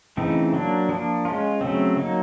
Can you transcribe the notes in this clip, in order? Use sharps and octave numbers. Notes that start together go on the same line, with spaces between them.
C#3 E3 A3 C4 D#4
F#3 A#3 D4
F3 A#3 D4
G#3 C#4 F4
C#3 F#3 A3 C4
F#3 A#3 D#4